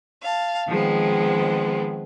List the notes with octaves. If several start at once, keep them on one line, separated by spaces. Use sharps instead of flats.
F5 A5
D#3 F3 G#3 B3 C4